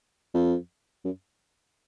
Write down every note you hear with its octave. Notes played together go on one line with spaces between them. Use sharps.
F2
F#2